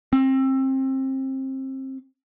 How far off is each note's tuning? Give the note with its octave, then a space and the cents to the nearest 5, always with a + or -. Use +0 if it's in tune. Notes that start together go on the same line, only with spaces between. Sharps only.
C4 +25